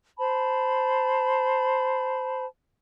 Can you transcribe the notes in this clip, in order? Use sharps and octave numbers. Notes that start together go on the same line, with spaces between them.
C5 A5 B5